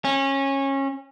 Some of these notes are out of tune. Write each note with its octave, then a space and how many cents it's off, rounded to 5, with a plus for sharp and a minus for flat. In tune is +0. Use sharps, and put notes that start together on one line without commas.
C#4 -20